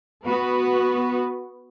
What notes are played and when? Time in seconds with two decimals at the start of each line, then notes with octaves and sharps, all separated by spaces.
0.24 B3 F#4 B4